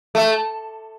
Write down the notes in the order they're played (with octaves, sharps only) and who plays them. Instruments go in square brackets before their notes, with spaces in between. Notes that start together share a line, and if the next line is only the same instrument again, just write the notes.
[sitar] A3